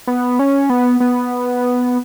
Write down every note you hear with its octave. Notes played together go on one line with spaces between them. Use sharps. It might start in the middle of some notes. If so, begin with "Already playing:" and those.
B3
C#4
B3
B3